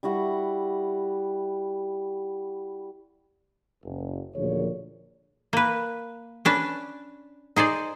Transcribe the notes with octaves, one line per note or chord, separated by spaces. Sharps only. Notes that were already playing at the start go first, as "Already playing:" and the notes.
G3 E4 F#4 F#5
F#1
F#1 D2 A#2 F3 G#4 C#5
A#3 B4
C#4 D4 B4
D#4 G#4 C5 D5